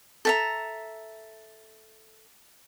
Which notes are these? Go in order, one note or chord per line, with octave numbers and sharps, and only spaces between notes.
A4 E5 A#5